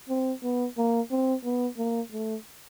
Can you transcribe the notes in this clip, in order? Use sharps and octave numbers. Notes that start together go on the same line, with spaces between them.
C4
B3
A#3
C4
B3
A#3
A3